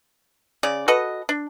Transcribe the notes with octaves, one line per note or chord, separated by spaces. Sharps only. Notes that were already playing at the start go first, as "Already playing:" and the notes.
C#3 D5
F#4 A4 B4 D#5
D4